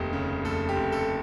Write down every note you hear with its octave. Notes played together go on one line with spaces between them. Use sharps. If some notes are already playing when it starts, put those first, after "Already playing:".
Already playing: F1 D#2 G4
C#3
F1 A4
G4
F1
A4